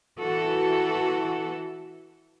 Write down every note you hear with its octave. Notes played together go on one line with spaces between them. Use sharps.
E3 F#4 A4